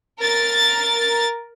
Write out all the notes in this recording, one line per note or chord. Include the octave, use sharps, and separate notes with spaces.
A#4 A6